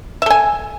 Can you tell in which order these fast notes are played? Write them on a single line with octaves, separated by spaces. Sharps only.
E5 A4 G#5